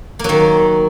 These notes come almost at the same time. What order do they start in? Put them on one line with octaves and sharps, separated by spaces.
A#3 F#3 D#3